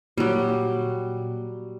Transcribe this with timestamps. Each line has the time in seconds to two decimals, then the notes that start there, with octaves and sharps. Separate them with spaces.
0.18 A#2 F#3 G3